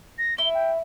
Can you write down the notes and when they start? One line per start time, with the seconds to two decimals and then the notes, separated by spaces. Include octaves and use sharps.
0.18 A#6
0.38 E4 G7
0.54 G5